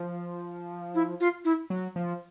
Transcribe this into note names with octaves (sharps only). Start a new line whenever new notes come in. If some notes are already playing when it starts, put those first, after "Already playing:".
Already playing: F3
E4
F4
E4
F#3
F3